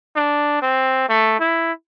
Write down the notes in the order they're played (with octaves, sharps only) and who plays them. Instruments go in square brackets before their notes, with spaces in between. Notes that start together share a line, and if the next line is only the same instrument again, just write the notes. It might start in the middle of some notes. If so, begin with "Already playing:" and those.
[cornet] D4
C4
A3
E4